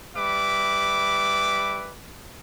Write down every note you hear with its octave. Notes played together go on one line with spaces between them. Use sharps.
G3 B4 E5 D6